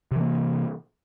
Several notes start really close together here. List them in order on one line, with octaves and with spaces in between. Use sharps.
C3 E3 A#3